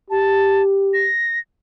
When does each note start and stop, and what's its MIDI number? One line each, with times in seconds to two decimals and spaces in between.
0.10 1.07 67
0.10 0.63 81
0.94 1.39 94